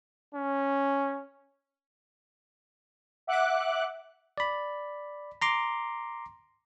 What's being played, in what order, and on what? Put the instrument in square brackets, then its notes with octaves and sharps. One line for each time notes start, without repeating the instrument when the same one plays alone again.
[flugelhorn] C#4
[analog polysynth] E5 F#5 D6 F#6
[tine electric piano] D5 B5
A#5 C6 D6